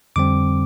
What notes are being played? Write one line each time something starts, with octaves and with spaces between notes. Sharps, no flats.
F2 D3 G3 C4 D6